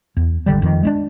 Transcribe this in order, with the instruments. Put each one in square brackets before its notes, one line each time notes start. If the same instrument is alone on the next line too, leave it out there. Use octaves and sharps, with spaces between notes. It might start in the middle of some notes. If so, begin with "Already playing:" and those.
[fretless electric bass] E2
G#1 D3 G3
F2 D#3
G#3 C#4 D4